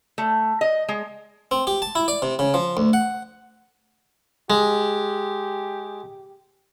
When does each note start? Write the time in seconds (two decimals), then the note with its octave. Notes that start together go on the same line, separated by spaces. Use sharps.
0.18 A3
0.61 D#5
0.89 G#3
1.51 C4
1.67 G4
1.82 A5
1.95 E4
2.08 D5
2.22 C3
2.39 C#3
2.54 F3
2.77 D2
2.93 F#5
4.50 G#3 G4